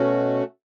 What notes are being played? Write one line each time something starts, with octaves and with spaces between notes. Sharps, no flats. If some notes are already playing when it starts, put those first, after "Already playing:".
Already playing: B2 A3 C#4 F#4